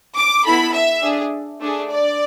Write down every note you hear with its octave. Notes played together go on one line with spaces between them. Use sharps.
D6
B3 E4 A4 B5
E5
D4 G#4
A3 D4 G#4
D5